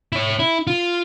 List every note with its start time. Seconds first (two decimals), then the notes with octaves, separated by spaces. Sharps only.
0.12 E4 C#5
0.39 E4
0.67 F4